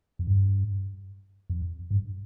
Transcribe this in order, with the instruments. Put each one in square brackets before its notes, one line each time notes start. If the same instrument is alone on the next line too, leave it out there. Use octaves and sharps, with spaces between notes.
[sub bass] F2
G2
F2
G2